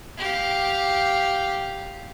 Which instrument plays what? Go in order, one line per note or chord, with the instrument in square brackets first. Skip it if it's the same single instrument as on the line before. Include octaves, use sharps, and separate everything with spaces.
[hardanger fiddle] G4 F5